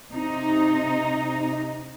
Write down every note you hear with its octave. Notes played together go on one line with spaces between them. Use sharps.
C3 D#4